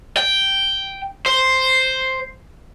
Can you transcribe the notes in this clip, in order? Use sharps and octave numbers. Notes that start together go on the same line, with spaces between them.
G5
C5